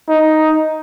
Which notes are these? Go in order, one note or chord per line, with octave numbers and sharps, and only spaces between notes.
D#4